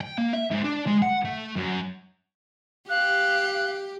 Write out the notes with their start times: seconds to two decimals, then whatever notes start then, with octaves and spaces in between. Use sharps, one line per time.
0.01 G5
0.18 A#3
0.33 E5
0.51 G#2
0.64 D4
0.87 G#3
1.02 F#5
1.25 A3
1.56 F#2
2.89 G4 F5 F#6